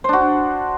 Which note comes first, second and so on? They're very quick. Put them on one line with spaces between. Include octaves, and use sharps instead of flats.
C5 D4 F#4